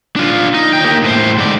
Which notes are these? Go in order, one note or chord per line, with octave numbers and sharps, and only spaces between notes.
D4 F4
D#4
D#2 G5
A#3 G4
A2 C5
G#2 D5